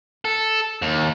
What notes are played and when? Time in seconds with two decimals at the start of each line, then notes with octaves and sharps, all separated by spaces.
0.25 A4
0.82 D#2